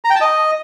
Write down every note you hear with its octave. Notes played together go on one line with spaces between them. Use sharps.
A#5
G5
A5
D#5